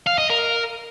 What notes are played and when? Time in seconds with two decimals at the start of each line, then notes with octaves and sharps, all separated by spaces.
0.07 F5
0.18 D#5
0.30 A#4